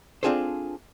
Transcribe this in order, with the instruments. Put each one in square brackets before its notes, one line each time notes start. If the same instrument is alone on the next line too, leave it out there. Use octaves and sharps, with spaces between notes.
[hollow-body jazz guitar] C4 D4 F4 G#4 A4 C5